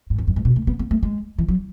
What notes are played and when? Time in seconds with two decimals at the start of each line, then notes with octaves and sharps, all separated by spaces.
0.10 G#2
0.18 E2
0.28 F#2
0.36 G#2
0.45 B2
0.56 A3
0.67 B3
0.79 B3
0.91 A3
1.03 G#3
1.38 E3
1.48 F#3